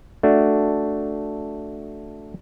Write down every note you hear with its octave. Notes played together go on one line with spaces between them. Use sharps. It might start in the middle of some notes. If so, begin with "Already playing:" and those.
A3 D4 F#4